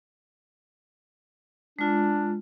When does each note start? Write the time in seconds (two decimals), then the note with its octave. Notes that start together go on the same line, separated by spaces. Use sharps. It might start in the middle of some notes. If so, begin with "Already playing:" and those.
1.79 G#3 D4 F4